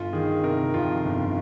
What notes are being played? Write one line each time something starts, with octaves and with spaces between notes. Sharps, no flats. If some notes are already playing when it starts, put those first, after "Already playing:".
Already playing: G1 F4
D#3 G#4
C3 A#4
F2 F4
G1